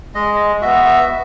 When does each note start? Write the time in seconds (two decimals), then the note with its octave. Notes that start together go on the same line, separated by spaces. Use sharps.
0.14 G#3 D#5
0.61 B3 F#4 E5
0.85 E5